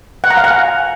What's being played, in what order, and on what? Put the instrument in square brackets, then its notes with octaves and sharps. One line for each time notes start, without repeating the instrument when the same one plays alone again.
[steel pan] F#5
A#5
F5
F#5
G#5